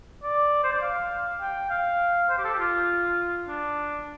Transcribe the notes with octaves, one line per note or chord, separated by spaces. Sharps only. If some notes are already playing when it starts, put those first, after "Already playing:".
D5
C5
D5
F5
G5
F5
C5
G4
A4
G4
F4
D4